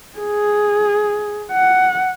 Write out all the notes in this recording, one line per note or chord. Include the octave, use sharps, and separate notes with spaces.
G#4
F#5